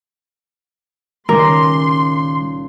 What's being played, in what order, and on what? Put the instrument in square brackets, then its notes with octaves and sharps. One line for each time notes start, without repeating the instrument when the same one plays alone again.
[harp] C#2 A#2 D#4 [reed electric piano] D#3 G3 D6 [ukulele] A#4 [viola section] C6